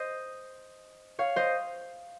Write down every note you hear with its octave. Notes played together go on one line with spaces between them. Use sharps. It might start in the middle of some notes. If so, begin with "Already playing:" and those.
Already playing: C5 D#5
C#5 F5
C5 D#5